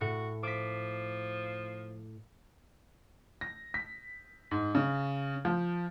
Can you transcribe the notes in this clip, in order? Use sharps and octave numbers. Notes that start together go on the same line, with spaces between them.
A2 F#4
F3 D6 B6
A#6
B6
G#2
C#3
F3